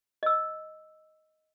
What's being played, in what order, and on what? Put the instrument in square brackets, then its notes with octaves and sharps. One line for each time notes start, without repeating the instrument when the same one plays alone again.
[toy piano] D#5 E6